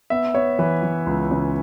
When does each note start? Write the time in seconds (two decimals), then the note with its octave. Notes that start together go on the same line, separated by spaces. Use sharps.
0.10 B3 E5
0.34 B3 C#5
0.59 E3 B4
0.83 E3
1.06 C#2
1.31 C#3